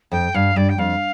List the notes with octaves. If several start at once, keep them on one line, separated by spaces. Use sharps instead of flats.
F2 G5
G2 F5
G2 D5
G5
F2 F5